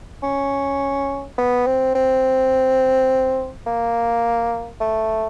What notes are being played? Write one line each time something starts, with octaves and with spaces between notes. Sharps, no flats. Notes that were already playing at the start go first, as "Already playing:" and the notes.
C#4
B3
C4
C4
A#3
A3